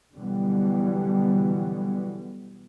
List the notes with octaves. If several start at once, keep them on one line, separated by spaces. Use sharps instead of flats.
B2 D3 E3 F#3 G3 B3